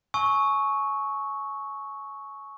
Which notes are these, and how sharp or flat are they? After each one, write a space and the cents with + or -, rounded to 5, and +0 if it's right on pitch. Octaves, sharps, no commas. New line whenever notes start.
G#5 +35 C#6 +0 E6 -30